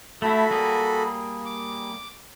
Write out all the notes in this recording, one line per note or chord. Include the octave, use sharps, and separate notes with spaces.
A3 E4 F#4 A4 B5
G3 A#3 G#4
D6